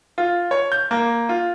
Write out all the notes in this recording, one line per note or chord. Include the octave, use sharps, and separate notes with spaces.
F4
C#5
G6
A#3
F4